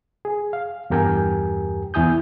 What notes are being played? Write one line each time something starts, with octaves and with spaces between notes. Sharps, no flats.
G#4
F5
E2 G2 G4 A#4 G5 G#5
E2 E4 G#5 D#6 G6